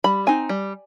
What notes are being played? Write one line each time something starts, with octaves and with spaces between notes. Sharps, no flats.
G3 B5
C4 D#4 G#5
G3